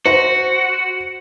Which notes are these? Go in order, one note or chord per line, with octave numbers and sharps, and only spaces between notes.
F#4 C5 A#6